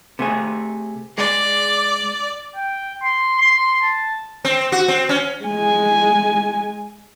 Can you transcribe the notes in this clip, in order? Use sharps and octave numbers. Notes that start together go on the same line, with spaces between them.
C3 A3 G#4
G#3 D5
G5
C6
C6
A5
C4
F#4
C4
C#4
G#3 G#5